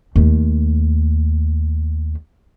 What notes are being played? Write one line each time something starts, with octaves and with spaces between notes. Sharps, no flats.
D#2 A3